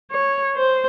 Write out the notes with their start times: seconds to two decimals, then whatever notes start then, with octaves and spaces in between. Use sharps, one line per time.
0.11 C#5
0.56 C5